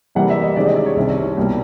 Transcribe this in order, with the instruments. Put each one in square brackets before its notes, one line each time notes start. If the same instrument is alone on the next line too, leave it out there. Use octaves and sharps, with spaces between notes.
[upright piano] C3 E3 G3 A#3 F#5
E5
D#5
C3 D#3 G#3 C#4 D5
D#5
D5
C#5
C2 C3 D#3
C2 B2 G3 A#3